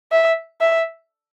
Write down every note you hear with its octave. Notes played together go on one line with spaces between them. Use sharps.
E5
E5